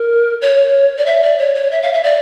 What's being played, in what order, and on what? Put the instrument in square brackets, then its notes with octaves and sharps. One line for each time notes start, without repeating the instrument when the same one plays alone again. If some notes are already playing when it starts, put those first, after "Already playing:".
Already playing: [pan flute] A#4
C#5
D5
E5
D5
C#5
C#5
E5
F5
E5
D5